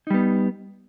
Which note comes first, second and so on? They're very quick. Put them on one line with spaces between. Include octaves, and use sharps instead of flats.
D#4 G3 B3